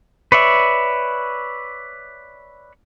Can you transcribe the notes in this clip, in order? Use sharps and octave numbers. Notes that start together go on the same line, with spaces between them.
B4 C#5 D5 E5